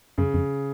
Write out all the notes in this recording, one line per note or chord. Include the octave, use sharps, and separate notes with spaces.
F#2 C#3
F2